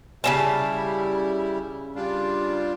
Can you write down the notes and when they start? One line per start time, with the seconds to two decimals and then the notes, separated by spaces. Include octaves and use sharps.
0.24 C#3 G3 C4 E4 A5
1.96 G3 D4 F4